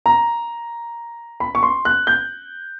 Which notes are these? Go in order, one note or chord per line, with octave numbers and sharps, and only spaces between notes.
A#5
B5
C#6
C6
F#6
G6